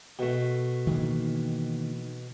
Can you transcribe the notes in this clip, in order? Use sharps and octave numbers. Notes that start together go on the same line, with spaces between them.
B2 A3
D#3 E3 A#3